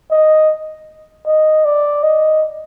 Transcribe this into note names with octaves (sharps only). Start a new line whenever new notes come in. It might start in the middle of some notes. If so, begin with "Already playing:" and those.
D#5
D#5
D5
D#5